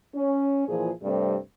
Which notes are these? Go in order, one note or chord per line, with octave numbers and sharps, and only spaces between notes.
C#4
A#2 E3 F3 G#4
G2 C3 G3 A3 C4